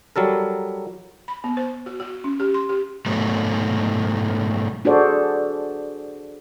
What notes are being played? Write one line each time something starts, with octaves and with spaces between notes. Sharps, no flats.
F#3 G3 A4 A#4
B5
B3
C5
F#4
F#4
C#4
G4
C6
G4
G#2 B2 F#3 A3
D4 F#4 G#4 A4 C5 D5